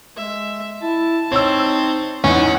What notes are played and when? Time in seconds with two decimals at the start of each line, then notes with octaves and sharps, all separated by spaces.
0.17 G#3 E5
0.82 E4 A5
1.32 C4 D#4 C#5 E6
2.24 E2 C#4 D#4 E4 F#5